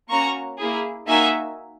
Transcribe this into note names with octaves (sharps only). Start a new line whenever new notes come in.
A#3 C#4 F#4 A#5 C#6
A#3 E4 G#4
A#3 D#4 F#4 E5 G#5